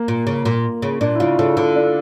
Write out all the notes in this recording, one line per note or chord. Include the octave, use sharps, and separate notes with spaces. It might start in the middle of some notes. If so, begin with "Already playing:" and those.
Already playing: A#3
A#2
C#3
A#2
C#3
A#2 D4
E4
C#3 F4
C#3 A4
D3 A4
D4